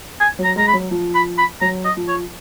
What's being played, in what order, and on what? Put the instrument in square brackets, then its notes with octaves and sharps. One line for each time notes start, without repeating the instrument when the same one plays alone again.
[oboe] G#5
[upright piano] F#3
[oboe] A#5
[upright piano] G#3 [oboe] A#5
[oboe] B5
[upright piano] F#3
F3
[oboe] B5
B5
[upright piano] F#3 [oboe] A#5
[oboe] D#5
[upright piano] F3
[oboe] C#5